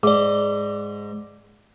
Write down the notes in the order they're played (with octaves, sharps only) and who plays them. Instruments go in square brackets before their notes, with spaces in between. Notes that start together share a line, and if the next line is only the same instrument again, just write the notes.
[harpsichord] G#2 [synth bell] D5 D6